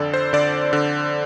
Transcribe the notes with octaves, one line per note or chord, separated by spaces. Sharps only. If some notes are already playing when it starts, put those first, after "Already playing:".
Already playing: F2 D3 A4 D5
C5
D3 D5
D3